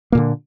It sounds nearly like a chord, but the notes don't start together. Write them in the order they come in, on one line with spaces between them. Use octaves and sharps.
A#3 A#2 D3